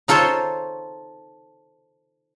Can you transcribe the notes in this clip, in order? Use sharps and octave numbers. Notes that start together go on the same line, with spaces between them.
D#4 F4 A4 C5 C#5